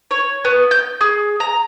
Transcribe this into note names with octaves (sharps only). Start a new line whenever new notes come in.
C#5
B3
G6
G#4
A#5